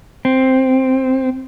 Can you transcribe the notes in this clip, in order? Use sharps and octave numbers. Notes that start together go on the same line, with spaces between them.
C4